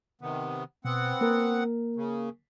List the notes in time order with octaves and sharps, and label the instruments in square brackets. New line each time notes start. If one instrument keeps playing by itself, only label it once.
[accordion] C3 D#3 B3
[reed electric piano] B2 [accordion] B3 C4 F#5
[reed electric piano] A#3 A#4
[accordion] C#3